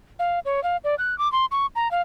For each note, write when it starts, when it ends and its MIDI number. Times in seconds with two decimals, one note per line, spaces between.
0.19 0.40 77
0.45 0.63 73
0.63 0.77 77
0.84 0.95 74
0.98 1.17 90
1.18 1.30 86
1.32 1.45 84
1.51 1.66 85
1.76 1.91 82
1.91 2.01 77